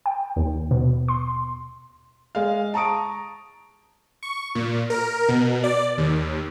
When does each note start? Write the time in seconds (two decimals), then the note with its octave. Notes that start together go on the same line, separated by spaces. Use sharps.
0.06 G5
0.36 D#2
0.71 B2
1.08 C6
2.35 G#3 F5
2.74 A5 A#5 C#6 D#6 D7
4.23 C#6
4.55 A#2
4.90 A#4
5.29 B2
5.64 D5
5.98 D#2